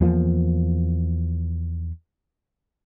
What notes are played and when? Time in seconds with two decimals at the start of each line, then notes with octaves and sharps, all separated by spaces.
0.01 E2 F3 A#3